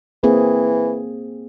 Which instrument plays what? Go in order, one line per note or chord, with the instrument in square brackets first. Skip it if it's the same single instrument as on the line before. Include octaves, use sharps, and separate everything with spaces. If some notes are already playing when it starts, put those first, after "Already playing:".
[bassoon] E3 [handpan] A#3 C4 G#4